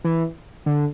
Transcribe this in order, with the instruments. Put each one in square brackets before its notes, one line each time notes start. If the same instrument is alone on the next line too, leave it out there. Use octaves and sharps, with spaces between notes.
[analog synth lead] E3
D3